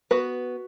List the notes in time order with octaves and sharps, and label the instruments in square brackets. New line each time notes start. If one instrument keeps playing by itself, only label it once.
[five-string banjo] B3 F#4 B4